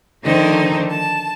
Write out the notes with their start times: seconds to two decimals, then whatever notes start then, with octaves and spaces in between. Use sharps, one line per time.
0.22 D3 D#3 F3 A3 C4 D#4
0.91 A5